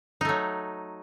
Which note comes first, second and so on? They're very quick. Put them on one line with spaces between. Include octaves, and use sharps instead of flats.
D#4 A3 F#3